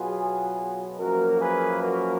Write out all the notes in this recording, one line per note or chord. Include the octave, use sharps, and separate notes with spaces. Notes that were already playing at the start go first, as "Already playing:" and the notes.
Already playing: B2 F#3 B3 F4 G#4
F#2 F3 A#3 F#4 A#4
G#4 B4
F#4 A#4